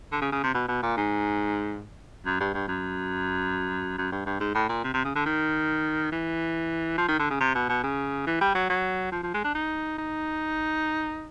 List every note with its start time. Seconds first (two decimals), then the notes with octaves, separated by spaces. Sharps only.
0.12 D3
0.22 C#3
0.32 C#3
0.44 C3
0.54 B2
0.68 B2
0.83 A#2
0.97 G#2
2.26 F#2
2.40 G2
2.54 G2
2.68 F#2
3.98 F#2
4.12 G2
4.26 G2
4.40 G#2
4.55 A2
4.69 A#2
4.84 C3
4.94 C3
5.05 C#3
5.16 D3
5.26 D#3
6.12 E3
6.98 F3
7.08 D#3
7.19 D3
7.30 C#3
7.40 C3
7.55 B2
7.69 B2
7.83 C#3
8.27 E3
8.41 G3
8.55 F#3
8.70 F#3
9.12 F3
9.23 F3
9.34 G#3
9.44 D4
9.55 D#4
9.98 D#4